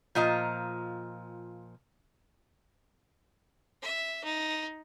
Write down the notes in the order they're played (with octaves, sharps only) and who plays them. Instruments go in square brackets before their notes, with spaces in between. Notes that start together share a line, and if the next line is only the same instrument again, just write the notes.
[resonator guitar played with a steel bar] A#2 F3 F4 D#5 A#5
[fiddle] E5
D#4